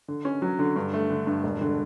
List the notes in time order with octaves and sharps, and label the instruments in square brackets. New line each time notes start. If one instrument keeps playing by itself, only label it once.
[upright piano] D3
C#4
F#3
D3
G2
A3
D3
G2
E1
D3